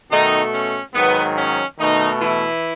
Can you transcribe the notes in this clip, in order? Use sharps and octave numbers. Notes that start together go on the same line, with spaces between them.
B2 D#3 A3 D#4
C#4
G#2 D#3 F#3 B3
C#4
B2 D#3 A3 D#4
E3 E4